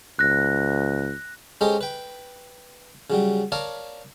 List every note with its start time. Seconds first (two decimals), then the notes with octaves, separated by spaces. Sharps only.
0.19 C#2 F#6 A#6
1.61 G#3 C#4 G4 A4 C5 D#5
1.81 B4 G5
3.10 C#3 F#3 G3
3.52 A#4 C#5 D5 F5 A5